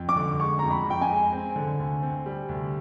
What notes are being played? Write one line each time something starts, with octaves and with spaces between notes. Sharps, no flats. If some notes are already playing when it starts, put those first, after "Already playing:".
Already playing: F2
D6
D3
G#3 C#6
F2 A#5
B5
F2 G5
G#5
G#3
C4
D3
D2
C4
G3
D2